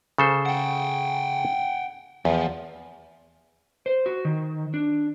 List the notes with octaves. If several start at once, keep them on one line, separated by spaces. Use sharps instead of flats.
C#3 A4 C5
F#5 G5
E2 F3
C5
F#4
D#3
D4